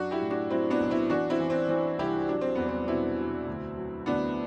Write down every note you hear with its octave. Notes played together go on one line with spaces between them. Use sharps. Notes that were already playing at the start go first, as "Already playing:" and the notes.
Already playing: F#2 F#3 D4 F#4
E4 G4
A2
D4 F#4
F#3 C4 E4
B3 D4
B1
C4 E4
E3 D4 F#4
C4 E4
E3
C4
E3 C4
C2 E4 G4
F#3 D4
C4
E2 B3
C4
B2 C4 E4
B2
D2
F#3
D2 B3 D4